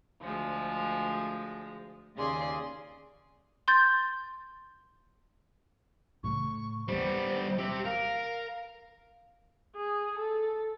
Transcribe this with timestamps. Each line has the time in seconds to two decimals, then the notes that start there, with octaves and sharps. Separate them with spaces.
0.21 D2 F3 G#3
2.16 D#2 C#3 G#4 D5 C6
3.68 C6 G6 A6
6.24 A2 C#3 C#6
6.88 D#2 G3 B3 C#4 C5
7.59 G4 E5
7.85 A#4 F5
9.76 G#4
10.18 A4